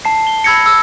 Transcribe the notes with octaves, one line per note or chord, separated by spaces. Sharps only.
A5 C7
G7
B5 E6 G#6 A#6 C#7
E6